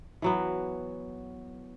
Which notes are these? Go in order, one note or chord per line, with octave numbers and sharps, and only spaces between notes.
E3 F#3 B3